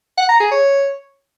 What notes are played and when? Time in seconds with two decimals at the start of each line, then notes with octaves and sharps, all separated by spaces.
0.17 F#5
0.29 A#5
0.40 G#4
0.51 C#5